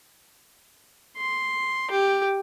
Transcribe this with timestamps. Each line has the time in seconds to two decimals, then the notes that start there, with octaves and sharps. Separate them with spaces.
1.17 C6
1.90 G4